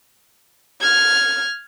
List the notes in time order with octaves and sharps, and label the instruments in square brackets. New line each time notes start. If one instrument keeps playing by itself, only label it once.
[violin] F6 G#6